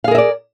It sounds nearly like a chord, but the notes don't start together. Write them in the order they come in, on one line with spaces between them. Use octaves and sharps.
F5 G#4 A#4 E5 D5